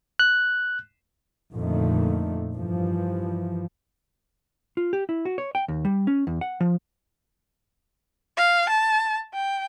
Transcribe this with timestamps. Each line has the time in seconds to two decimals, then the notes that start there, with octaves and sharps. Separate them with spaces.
0.19 F#6
1.54 F2 A#2 D3 D#3 A3
2.54 G2 E3 F3
4.77 F4
4.93 G4
5.09 E4
5.25 F#4
5.38 C#5
5.55 G5
5.68 D#2
5.85 G3
6.07 C#4
6.27 E2
6.41 F#5
6.60 F3
8.38 F5
8.69 A5
9.34 G5